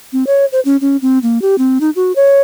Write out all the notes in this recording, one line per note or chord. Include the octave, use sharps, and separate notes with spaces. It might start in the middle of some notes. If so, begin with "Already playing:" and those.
C4
C#5
C5
C#4
C#4
C4
A#3
G4
C4
D#4
F#4
C#5